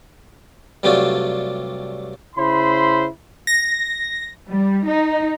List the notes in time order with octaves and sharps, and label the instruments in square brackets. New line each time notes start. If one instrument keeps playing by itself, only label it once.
[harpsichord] G2 C3 F#3 A3 D4 F4
[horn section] C#3 E4 C5 B5 C6
[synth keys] A#6
[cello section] G3
D#4